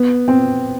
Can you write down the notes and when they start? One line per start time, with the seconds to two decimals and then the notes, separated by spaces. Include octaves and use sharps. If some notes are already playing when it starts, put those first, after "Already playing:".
Already playing: B3
0.28 C4